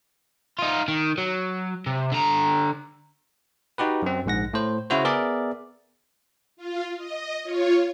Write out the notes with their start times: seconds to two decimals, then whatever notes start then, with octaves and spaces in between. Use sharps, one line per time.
0.59 D#4 F4
0.88 D#3
1.18 F#3
1.86 C3
2.12 D3 A#5
3.78 D#4 F#4 G4 B4
4.02 F#2 C4
4.26 A#1 G#2 F#5 A#6
4.53 A2 C5
4.90 C#3 E4 F#4 C5
5.05 B3 G#4 A#4 D5 E5
6.57 F4
6.96 D#5
7.43 F4 C#5